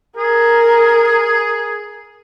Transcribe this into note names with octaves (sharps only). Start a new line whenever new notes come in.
G#4 A#4